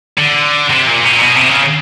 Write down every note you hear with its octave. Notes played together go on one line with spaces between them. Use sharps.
D3
C3
A#2
B2
A#2
B2
C3
C#3